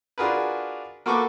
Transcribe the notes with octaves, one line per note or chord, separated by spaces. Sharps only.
D4 F4 F#4 G#4 A#4 B4
A#3 F#4 A4 B4 C#6 D6